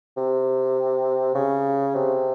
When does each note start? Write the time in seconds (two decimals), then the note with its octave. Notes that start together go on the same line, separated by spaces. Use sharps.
0.17 C3
1.35 C#3
1.95 C3